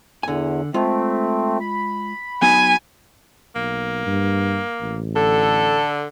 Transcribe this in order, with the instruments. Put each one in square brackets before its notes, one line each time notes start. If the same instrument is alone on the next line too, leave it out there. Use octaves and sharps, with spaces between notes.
[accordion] E2 [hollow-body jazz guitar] D3 G#5
[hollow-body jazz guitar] G#3 F4 [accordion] A3 C4
[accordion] B5
[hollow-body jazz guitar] F#3 B3 D#4 [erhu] G#5
[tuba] B1 [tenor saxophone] A#3
[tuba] G2
A1
[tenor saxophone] D3 [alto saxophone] A4